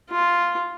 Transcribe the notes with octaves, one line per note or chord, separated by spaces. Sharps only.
F4